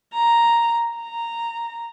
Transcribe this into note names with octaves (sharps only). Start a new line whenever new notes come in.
A#5
A#5